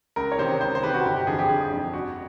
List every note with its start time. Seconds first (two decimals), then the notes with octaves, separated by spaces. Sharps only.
0.16 C#2 A#4
0.32 C#5
0.38 C3 D#3 C5
0.61 C#2 C5
0.75 C5
0.83 C3 D#3 B4
0.94 F#4
1.05 G1 G4
1.16 G4
1.27 F2 D3 F3 G#4
1.39 G4
1.49 G1 G#4
1.72 F2 D3 F3
1.93 F2 F#4